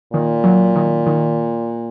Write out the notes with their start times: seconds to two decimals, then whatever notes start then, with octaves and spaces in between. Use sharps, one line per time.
0.13 A#2 D#3
0.44 F#3
0.76 D#3
1.07 D#3